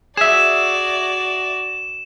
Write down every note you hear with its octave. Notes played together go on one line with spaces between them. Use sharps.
F#4 G#4 D5 E5 E7